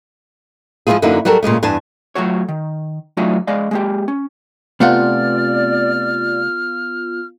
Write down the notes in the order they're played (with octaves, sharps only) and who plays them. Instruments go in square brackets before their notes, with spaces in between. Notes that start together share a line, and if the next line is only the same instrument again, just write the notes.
[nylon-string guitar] F3 G#3 B3 E4 F4 G#4
F#2 D3 A#3 D#4 E4 F#4
F#3 G3 F#4 A4 A#4
A#2 C#3 G#3 A3
E2 G2 D4 G#5 A5
[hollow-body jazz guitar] F#3 A3 F4 F#4 C#5
D#3
F#3 A3 D4 D#4 F4 F#4
G#3 D5 D#5 F5
G#3 A#3 G4
C#4
[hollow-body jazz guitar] C3 A3 F#5 [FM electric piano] B3 F4 [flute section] D5 [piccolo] F6